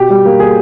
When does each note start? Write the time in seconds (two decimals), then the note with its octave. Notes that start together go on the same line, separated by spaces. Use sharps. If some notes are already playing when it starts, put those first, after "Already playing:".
Already playing: B2 G4
0.10 G3
0.25 A#3
0.39 B2 G#4